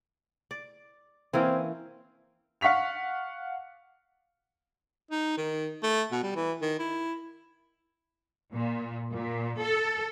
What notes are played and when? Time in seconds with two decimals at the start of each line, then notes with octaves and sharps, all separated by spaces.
0.51 D5
1.34 E3 A#3 C4 C#4
2.61 F5 F#5 C#6 B6 F7
5.11 D#4
5.37 D#3
5.83 A3
6.12 B2
6.23 G3
6.36 E3
6.62 D#3
6.79 E4
8.52 A#2
9.13 A#2
9.60 A4